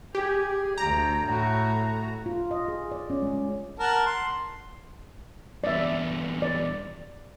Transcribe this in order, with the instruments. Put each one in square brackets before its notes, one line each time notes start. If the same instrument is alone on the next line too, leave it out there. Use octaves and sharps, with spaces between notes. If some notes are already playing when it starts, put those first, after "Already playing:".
[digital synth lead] G4 [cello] G#4
[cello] D2 G5 [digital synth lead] A#5
[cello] A2 F#4
[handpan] F4
D#5
G#4
D5
C#4
G#3
[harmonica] A#4 F#5 A5
C6
[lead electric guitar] E2 G2 [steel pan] D5 E5
[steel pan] D5